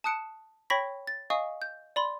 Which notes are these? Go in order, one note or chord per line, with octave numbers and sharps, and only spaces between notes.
A5 D#6 F#6 C#7 D7 E7
C#5 G5 B5 C#6 A#6 B6
A6
D#5 F5 G#5 C#6 D#6
G6
D5 B5 C6